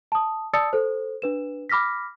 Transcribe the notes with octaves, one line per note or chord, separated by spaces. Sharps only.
A5 D#6
D5 A5 D#6 E6 A6 C#7
A4 C5
D4 B4 E7
B5 D6 F6 A#6 B6